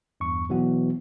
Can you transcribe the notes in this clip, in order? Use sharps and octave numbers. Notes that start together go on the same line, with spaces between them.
E2 G2 C#6
B2 E3 F#3 B3 F#4